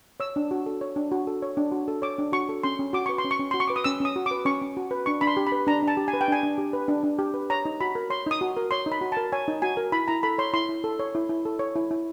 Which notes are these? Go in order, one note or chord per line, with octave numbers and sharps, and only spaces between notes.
C#5 E6
D4
F#4
A4
C#5
D4
F#4
A4
C#5
D4
F#4
A4
C#5 D6
D4
F#4 C#6
A4
C#4 C6
C#4
F#4 D6
B4 C#6
C6
C#4
C#6
C#4
F#4 C6
C#6
B4 D6
D#6
C#4 E6
C#4 D#6
F#4
D6
B4
C#4 C#6
C#4
F#4
B4
D4 C#6
D4 B5
C6
G4
B5
B4
D4 A#5
D4
A5
G4
G#5
B4
G5
D4 G#5
D4
G4
B4
D4
D4
G4
B4
C#5 A#5
D#4
F#4 B5
A#4
C#5 C6
D#4 D#6
F#4
A#4
C#5 C6
D#4
B5
F#4
A5
A#4
C#5 G#5
D#4
F#4 G#5
A#4
E4 B5
E4 A#5
A4 B5
C#5 C6
E4 C6
E4
A4
C#5
E4
E4
A4
C#5
E4
E4